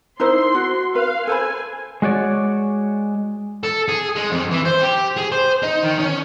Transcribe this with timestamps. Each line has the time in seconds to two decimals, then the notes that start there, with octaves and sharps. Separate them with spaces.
0.20 D#4 E4 C5 C6
0.55 F#4
0.95 B4 F5
1.27 A4 C5 G#5 B5
2.02 G#3 F#4 C#5 D5
3.64 A4
3.88 G#4
4.16 G#3
4.31 F2
4.51 E3
4.65 C5
4.82 G4
5.17 G#4
5.32 C5
5.62 D#4
5.83 D#3
5.99 C#4